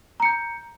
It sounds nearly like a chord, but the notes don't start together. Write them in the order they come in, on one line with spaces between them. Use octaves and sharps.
A#5 C#7 G6